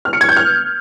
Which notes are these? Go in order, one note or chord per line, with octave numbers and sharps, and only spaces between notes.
F6
C#7
G#6
G6
F6